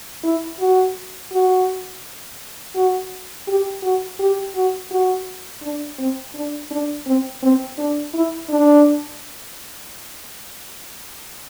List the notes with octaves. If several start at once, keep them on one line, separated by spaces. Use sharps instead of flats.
E4
F#4
F#4
F#4
G4
F#4
G4
F#4
F#4
D4
C4
D4
D4
C4
C4
D4
E4
D4